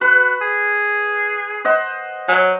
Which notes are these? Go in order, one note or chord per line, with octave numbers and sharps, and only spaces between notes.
F#4 B4
G#4
C5 D#5 F#5
F#3 G#5